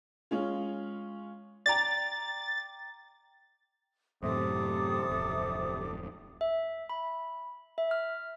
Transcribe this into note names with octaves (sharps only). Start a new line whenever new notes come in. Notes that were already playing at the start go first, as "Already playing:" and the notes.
G#3 C#4 F4
D5 G5 A#5 A6
F#2 A2 C3 E3 A4 D6 D#6
D1 F2
E5
B5
E5
F6